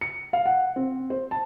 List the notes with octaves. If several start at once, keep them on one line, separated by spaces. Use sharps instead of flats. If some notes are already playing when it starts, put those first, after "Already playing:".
C#7
F5
F#5
C4
C5
A5